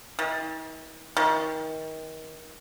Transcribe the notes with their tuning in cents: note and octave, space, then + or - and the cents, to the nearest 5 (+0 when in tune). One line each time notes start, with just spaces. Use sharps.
D#3 +45
D#3 +30